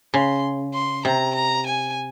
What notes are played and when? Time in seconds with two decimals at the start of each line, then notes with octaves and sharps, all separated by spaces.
0.14 C#3 C6
0.74 C6
1.05 C3 A#5
1.35 A#5
1.66 G#5